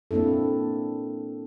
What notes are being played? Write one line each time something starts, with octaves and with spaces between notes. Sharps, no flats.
A#3 C4 D4 E4 A4